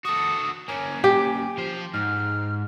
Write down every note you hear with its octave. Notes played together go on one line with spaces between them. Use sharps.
F#4 A4 D#6
A#3 C#4 G#5
G4
F3 C5
G#2 F6